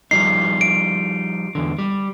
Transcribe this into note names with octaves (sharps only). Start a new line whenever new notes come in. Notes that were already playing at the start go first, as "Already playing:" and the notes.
F3 G3 D#4 C7
D7
E2 D3
G3